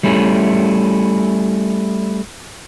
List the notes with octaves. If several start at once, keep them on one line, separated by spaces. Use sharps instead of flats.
G3 A3 C#4 E4